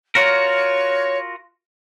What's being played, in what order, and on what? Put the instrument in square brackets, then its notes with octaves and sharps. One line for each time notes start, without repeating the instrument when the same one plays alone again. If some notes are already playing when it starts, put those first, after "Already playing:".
[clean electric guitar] F4 F#4 A#4 [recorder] C#5